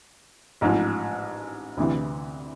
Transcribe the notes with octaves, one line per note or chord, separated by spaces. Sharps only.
A1 G#2 F3
D2 C3 E3